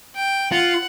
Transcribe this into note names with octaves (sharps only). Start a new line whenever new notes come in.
G5
F4 F#5